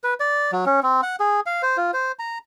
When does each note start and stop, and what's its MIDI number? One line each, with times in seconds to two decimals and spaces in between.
0.04 0.14 71
0.20 0.51 74
0.52 0.65 54
0.66 0.80 61
0.83 1.01 60
1.03 1.16 78
1.20 1.40 68
1.46 1.62 77
1.62 1.77 72
1.77 1.91 65
1.94 2.12 72
2.19 2.38 82